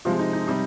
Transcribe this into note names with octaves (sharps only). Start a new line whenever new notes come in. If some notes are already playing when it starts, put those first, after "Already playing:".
C3 F3 G#3 F4
D#4
D#4
C3 G3 D#4